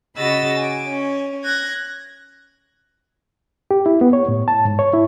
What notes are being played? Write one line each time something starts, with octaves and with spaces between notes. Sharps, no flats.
C#3 F#4 D#5 B5 E6 A6
G#5 D6
C#4
F#6 G#6 A#6
G4
E4
B3
C#5
A2
A5
G#2
C#5
E4